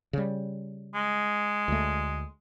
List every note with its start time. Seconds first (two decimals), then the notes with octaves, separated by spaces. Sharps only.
0.13 C#3 G3
0.95 G#3
1.68 D2 A3